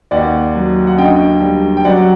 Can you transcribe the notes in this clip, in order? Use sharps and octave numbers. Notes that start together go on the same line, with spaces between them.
D#2 D5 F#5
F#3
F#5
D3 D#5 G5
G3
G5
F#3 D5 F#5